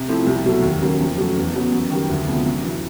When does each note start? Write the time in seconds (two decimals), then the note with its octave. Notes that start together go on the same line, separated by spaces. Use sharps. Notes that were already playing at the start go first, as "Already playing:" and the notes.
Already playing: C3
0.08 F3 A3 C4 E4
0.27 C2
0.44 B2 F#3 A3
0.63 D#2
0.82 C#3 F#3 A#3
0.99 F2
1.18 C#3 F#3 A3
1.37 E2
1.55 C#3 F#3 B3
1.72 F#2
1.90 D#3 G3
2.10 D2
2.28 C3 F3 G#3 B3
2.46 F#2
2.63 C#3 E3